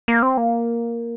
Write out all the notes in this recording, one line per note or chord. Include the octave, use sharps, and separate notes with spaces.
A#3
C4
A#3